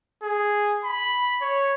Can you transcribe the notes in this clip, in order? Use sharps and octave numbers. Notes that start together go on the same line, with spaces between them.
G#4
B5
C#5